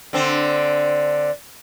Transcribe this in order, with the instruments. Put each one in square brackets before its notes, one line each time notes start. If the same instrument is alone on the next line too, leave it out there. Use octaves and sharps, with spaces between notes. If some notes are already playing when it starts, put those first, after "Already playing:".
[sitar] D3 C4